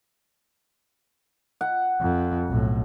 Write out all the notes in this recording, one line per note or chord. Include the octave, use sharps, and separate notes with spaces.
F#5
F2
B1 A2